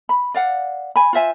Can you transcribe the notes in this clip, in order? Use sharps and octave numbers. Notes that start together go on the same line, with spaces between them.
B5
D5 F5 F#5
G#5 B5
F4 C5 E5 G#5